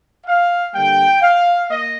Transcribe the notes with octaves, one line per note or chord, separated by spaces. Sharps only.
F5
D3 G3 A#3 G5
F5
A#3 D#5